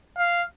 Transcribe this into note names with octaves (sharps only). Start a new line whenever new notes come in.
F5